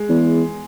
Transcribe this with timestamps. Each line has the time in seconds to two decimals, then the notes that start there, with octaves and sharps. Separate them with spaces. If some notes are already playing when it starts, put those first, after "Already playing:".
Already playing: G#3
0.09 E2